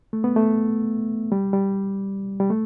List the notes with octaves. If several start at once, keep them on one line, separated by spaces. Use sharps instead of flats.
A3
B3
A3
G3
G3
G3
A3